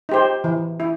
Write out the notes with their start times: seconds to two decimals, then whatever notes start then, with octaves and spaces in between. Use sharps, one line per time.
0.09 D#4 G4 C5
0.44 E3
0.80 E4